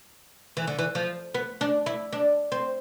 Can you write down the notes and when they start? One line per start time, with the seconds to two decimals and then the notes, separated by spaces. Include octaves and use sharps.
0.57 E3
0.67 D3
0.79 E3
0.95 F3
1.34 B3
1.61 D4
1.86 E4
2.13 D4
2.52 C4